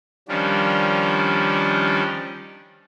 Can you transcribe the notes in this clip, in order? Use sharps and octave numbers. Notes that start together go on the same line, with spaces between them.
D#3 F3 G3 C#4 D4